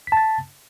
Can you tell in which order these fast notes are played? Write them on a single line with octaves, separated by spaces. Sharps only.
B6 A5 A6